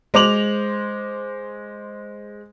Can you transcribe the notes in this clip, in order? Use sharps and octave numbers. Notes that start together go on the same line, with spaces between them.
G#3 C5 D6 F7 F#7